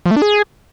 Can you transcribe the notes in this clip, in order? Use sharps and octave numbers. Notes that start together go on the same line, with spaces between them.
F3
A3
D4
G#4